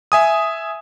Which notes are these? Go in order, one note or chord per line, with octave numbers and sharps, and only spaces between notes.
E5 G#5 D#6